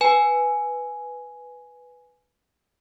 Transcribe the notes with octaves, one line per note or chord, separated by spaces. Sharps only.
B4 G#5